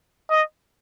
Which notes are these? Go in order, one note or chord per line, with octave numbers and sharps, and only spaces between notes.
D#5